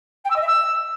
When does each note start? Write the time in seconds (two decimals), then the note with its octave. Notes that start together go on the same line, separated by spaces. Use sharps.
0.24 G5
0.30 E6
0.35 D#5
0.41 E5
0.47 E6